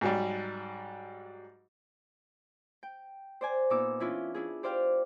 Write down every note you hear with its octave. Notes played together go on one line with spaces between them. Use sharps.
G#2 F#3 G3
G5
C5 D5 G#5
A#2 B3 D#4 D6 E6
E3 C#4 D4 E4 F4
D4 E4 G#4
G4 C5 D5 F5 G5